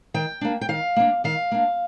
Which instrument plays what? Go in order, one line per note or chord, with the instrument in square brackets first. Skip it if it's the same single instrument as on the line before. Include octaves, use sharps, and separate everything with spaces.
[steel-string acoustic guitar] D#3 G5
A#3 D4
G5
D#3 F5
A#3 D4
D#3 F5
A#3 D4